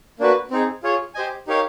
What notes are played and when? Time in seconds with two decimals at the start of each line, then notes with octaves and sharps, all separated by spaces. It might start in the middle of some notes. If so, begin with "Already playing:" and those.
0.19 A#3 D4 F#4 B4
0.51 C4 D#4 G#4
0.83 F4 G#4 C#5
1.15 G4 C5 D#5 G#5
1.47 D#4 G4 A#4 C#5 F5